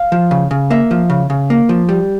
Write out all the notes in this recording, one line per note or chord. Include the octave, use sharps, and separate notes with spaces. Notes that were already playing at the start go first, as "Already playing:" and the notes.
Already playing: F5
F3
C#3
C#3
A#3 E5
F3
C#3
C#3
A#3
F3
G3